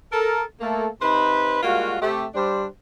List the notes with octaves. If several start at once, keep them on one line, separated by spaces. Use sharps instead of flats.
A4 A#4
A3 A#3 A4
C3 D#4 B4 C5 B5
G3 G#3 A#3 F4 F#4
C3 A3 G4
G3 D4 C5